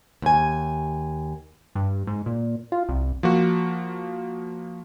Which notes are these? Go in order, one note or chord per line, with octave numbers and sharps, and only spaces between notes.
D#2 G#5
G2
G#2
A#2
F4
C2
F3 A#3 F#4